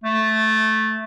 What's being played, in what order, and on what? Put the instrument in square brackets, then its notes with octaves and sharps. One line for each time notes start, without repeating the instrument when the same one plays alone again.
[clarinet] A3